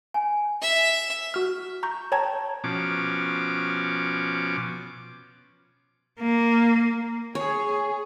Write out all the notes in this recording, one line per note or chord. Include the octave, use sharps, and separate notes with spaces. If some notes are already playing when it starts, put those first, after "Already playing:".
G#5
E5
F#4 F6
A#5 C#6 G6
C#5 G5 A5 A#5 G#6
B2 F3 C#4 D6
A#3
G#4 C#5